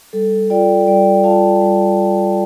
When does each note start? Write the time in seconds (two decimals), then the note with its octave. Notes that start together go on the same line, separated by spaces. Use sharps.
0.13 G3 A4
0.50 F4 D5 G5
0.87 G3 D5 G5
1.24 F4 F5 A5
1.61 G3